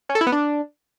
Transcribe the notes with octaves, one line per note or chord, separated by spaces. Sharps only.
C#4
A4
E4
B3
D4